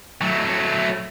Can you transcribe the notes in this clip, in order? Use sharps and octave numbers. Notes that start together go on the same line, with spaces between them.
F#3 A3